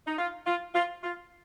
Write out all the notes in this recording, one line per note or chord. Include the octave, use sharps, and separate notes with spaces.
D#4
F4
F4
F4
F4